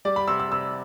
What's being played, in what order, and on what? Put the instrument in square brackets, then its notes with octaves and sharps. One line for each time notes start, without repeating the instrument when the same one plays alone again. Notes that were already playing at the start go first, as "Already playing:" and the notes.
[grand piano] G3 D5
B5
C3 E6
E6
C3 E6